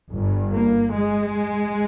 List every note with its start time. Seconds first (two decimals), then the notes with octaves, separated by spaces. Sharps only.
0.13 G1 G2
0.53 A#3
0.92 G#3